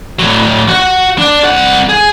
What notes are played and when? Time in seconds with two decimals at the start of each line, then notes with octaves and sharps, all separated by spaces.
0.19 A2 F#3
0.69 F#4 F#5
1.18 D4
1.44 C2 F#5
1.89 G#4